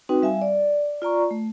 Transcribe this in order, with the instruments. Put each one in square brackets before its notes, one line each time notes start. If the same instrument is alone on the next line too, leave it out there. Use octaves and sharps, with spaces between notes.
[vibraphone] C4 D#4 F#4 B4 G5
G3 E5 F5 G#5
D5
F4 D5 A#5 C#6
A3